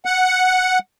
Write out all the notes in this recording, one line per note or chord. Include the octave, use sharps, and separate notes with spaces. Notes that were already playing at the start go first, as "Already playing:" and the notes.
F#5